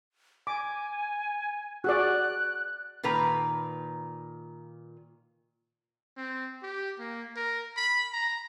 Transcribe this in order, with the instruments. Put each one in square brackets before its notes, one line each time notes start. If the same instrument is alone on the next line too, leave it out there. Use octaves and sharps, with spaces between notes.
[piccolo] G#5 [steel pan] D6
[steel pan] F#4 G#4 D5 [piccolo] F#6
[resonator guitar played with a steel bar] A#2 D#3 B4 A#5
[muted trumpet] C4
G4
A#3
A#4
B5
A#5